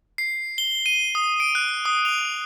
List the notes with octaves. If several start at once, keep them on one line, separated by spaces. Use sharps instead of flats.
C7
G7
D#7
D#6
D7
F#6
D#6
F7